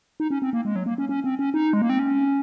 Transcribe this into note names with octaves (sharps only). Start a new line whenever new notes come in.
D#4
C#4
C4
A#3
G#3
F#3
A#3
C#4
C#4
C4
C#4
D#4
G#3
A#3
C4
C#4